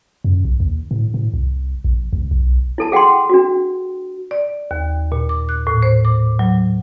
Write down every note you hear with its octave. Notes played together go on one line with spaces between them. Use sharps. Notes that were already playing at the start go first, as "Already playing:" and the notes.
F#2
B1
D#2
A2
A2
C2
A#1
C#2
B1
E4 A4 A5
G#4 F#5 G5 A5 C6
D4 F#4
D5
D#2
A#2
D6
F#6
A2
C5
D6
F#3